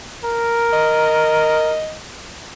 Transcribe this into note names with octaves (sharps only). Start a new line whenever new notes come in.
A#4
D#5